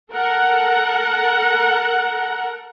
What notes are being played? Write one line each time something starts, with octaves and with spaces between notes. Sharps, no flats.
A4 A#4 F#5